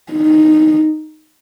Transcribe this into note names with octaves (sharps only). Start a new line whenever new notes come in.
D#4